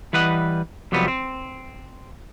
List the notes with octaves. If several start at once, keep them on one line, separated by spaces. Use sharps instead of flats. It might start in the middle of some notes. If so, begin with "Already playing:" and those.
E3 G3 B4 D#5 F#5
F2 C3 F#3 G3 B3
C4